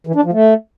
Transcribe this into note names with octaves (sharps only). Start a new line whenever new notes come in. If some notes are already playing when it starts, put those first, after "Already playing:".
E3
D4
F3
A3